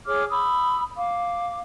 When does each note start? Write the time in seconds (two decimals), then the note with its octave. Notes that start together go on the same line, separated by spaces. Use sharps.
0.06 G#4 C#5 D6 F6
0.29 B5 D#6 E6
0.96 F5 D6